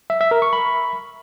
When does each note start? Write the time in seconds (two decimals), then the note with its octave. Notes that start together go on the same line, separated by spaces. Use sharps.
0.10 E5
0.21 E5
0.31 A#4
0.42 C#6
0.53 B5